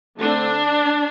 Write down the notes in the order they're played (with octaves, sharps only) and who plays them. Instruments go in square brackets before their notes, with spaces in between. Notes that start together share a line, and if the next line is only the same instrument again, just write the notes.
[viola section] D3 A3 C4 D4